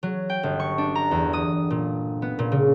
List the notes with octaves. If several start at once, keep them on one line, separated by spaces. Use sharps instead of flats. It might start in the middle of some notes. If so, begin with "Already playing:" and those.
F#3
G5
G1
C#6
D4
A#5
E2
D#6
A#2
B3
A#2
C#3